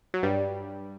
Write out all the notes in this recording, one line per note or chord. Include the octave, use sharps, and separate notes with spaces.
F#3
G2 G3